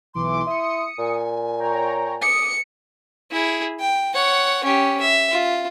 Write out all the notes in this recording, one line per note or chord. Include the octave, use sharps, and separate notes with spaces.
B1 E3 C6 D6
E4 D#6 C#7
A#2 G#5
C#5 G5 A#5
D6 D#6 C#7 D7
E4 G#4
G5
C#5 F#5
C#4 G4
E5
F4